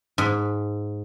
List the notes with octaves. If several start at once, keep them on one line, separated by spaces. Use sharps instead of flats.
G#2